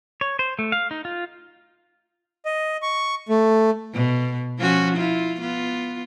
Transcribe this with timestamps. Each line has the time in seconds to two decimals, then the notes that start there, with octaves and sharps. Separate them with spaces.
0.21 C#5
0.39 C5
0.59 A3
0.72 F5
0.91 D#4
1.05 F4
2.45 D#5
2.82 C#6
3.29 A3
3.94 B2
4.59 F3 C#4 F#4
4.97 E4 F4
5.40 B3 F4